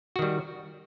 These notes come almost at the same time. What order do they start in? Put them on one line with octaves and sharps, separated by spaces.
F#4 D#3 G3